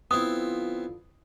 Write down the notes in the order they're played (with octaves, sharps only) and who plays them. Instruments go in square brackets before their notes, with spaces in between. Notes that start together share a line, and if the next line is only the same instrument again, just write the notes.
[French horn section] D3 F3 F4 [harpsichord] B3 C4 E4 [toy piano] D#6